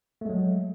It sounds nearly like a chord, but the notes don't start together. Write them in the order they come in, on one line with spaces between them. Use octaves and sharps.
A3 G#3 F#3